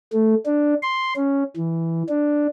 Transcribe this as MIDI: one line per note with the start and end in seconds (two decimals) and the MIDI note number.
0.13 0.35 57
0.46 0.74 62
0.83 1.14 84
1.16 1.44 61
1.57 2.03 52
2.09 2.47 62